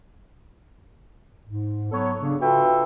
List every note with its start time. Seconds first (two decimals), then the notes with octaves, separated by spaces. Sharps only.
1.45 G#2
1.91 F#3 B3 A4 C#5
2.20 C#3 D4
2.41 F4 F#4 A4 B4 E5 G5